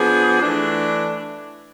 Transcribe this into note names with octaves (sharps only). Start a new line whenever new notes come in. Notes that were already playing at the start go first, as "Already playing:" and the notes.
Already playing: F3 B3 D4 G#4
E3 A3 D4